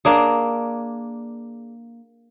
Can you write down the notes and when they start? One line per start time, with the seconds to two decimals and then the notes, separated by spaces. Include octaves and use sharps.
0.05 A#3 D4 G#4